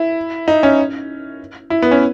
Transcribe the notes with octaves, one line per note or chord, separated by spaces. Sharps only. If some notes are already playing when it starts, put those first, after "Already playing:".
Already playing: E4
D#4
C#4
E4
B3
C#4